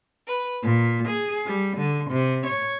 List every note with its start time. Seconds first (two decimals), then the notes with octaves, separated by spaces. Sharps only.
0.27 B4
0.62 A#2
1.07 G#4
1.45 G3
1.77 D3
2.11 C3
2.46 C#5